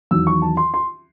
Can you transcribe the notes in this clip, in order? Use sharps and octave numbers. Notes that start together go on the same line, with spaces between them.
E2 D#3 F#3 E6
C#6
A5
C6
C6